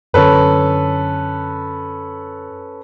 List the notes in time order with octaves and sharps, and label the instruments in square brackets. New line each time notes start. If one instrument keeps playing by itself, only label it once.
[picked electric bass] F#2 D3 [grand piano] C#4 A4 B4